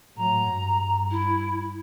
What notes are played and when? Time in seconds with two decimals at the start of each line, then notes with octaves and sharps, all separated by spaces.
0.17 A2 F#3 A#5
0.50 G2
1.11 E4